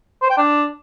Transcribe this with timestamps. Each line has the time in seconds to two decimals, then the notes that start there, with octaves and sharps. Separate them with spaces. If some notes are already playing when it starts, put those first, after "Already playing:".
0.22 C5
0.30 G5
0.38 D4